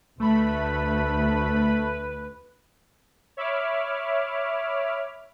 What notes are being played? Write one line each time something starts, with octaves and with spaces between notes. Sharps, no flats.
D2 A3 B4 B5
C#5 E5 B5 D6 F6